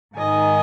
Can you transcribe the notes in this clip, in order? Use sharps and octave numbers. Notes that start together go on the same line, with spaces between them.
G#2 D#3 D#5 G#5